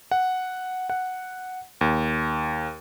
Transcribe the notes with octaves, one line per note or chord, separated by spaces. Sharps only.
F#5
F#5
D#2